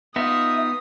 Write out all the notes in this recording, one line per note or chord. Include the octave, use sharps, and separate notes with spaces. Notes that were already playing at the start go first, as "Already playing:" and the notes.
B3 D#4 F4 E5 D#6